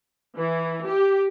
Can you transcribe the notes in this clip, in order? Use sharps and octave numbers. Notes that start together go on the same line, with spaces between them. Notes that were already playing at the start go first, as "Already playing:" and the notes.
E3
G4